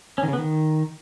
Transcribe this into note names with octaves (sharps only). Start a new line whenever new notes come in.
C#4
D#3
C#3
B3
D#3